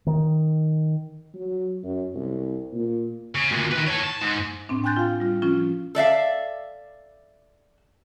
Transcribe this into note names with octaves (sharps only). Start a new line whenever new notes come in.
D#3
F#3
F#2
C2
A#2
C#3
D2 A#2
D#3 B4
A4 C#5
A5
G#2
A2 C4 D4
G5 G#5 C6 F#6 G6 A6
F4 F5
G3 F4
F3 C#4 F4
A4 D5 E5 F5